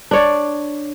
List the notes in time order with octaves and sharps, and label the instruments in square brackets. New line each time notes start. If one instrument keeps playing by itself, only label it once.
[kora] D4 C#5 D5